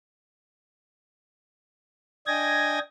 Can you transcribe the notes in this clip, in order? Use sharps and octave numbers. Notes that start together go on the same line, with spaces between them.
D4 D#5 G5 G#5 G#6 A#6